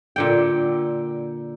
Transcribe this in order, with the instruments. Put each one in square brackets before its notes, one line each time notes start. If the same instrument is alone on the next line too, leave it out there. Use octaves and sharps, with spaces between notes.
[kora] A#2 D3 G5